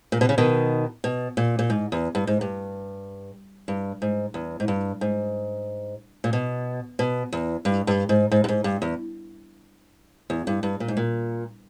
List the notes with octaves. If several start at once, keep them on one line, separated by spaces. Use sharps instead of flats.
A#2
B2
C#3
B2 D#3
B2
A#2
A#2
G#2
E2
G2
G#2
G2
G2
G#2
E2
G#2
G2
G#2
A#2
B2
B2
E2
G2
G2
G#2
G#2
G2
G#2
G2
E2
E2
G2
G2
A#2
G#2
A#2